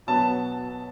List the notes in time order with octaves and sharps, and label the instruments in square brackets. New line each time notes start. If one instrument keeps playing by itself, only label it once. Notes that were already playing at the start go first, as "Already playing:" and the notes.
[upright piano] B2 F#3 B3 A5